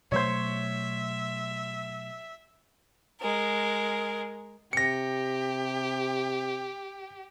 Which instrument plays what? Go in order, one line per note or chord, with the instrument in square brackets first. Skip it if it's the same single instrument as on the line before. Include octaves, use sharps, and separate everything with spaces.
[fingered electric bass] B2 F#3 A3 [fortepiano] C5 C#5 [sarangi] E5
[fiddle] G#3 A#4
[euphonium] C3 [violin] G4 [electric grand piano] A#6 C#7